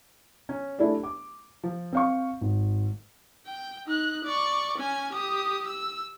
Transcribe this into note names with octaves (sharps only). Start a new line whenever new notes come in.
C#4
A3 D4 E4 G4 G#4 D5
D6
F3
C4 F5 C#6
G#1
G5
D#4 F#6
D5 C#6
C#4 G#5
G4 D#6
E6